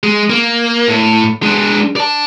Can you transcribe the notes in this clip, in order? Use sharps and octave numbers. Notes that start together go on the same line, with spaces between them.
G#3
A#3
A2
G#3 D4
D5 A5